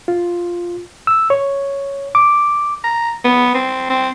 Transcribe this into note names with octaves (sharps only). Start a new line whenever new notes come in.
F4
E6
C#5
D6
A#5
B3
C4
C4